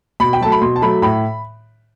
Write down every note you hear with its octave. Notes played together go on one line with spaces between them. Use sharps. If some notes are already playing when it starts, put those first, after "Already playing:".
B2 B5
G5
F#3 A3 A5
B5
B2 C6
A5
F#3 A3 B5
A2 B5